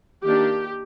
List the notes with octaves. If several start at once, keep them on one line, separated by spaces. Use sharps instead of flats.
D#3 A#3 D4 G4